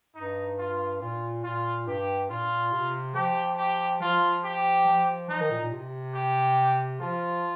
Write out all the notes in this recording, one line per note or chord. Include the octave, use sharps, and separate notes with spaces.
G2 D#4
F4
A#2 F4
A#2 F4
G2 G4
A#2 F4
C3
F3 G4
G4
F3 F4
G4
F3
F3 D#4
D#3
A#2
A#2
C3
G4
F3 F4